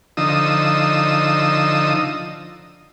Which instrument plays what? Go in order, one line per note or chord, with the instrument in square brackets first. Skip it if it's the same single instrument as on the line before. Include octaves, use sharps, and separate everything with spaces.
[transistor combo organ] D3 F3 D#4 D#6 E6